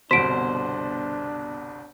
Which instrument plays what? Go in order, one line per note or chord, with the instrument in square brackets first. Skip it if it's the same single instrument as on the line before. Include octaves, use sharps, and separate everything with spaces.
[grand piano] G1 C2 B2 [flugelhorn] D4 [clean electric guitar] C5 [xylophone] B6 D7